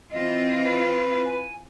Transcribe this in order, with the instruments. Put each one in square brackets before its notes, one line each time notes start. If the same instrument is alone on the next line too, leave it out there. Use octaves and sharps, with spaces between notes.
[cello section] E3 C4 F4 [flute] D#5
[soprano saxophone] B4
[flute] G#5